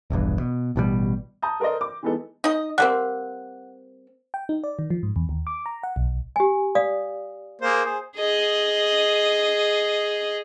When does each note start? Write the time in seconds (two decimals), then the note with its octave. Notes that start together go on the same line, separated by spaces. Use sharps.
0.10 E1 A#1 E2 G2
0.40 B2
0.76 A1 B2 D#3 G3
1.42 A5 A#5 D#6 G6
1.60 A4 A#4 C5 D5 D#5
1.81 D6
2.03 E3 G#3 B3 D#4 A4
2.44 D#4 D#5
2.78 G3 A#3 C4 F#5 F#6
4.34 G5
4.49 D#4
4.64 D5
4.79 D#3
4.90 F3
5.03 G#2
5.16 E2
5.29 D#2
5.47 D6
5.66 A#5
5.83 F#5
5.96 B1
6.36 G4 G#5
6.75 D5 F5 D#6
7.62 A#3 G#4 C5
7.85 G#4 C5
8.17 G#4 D#5